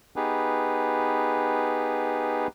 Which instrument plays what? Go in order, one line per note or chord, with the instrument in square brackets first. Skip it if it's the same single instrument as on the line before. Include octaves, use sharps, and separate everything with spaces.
[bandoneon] B3 D#4 G4 G#4 B4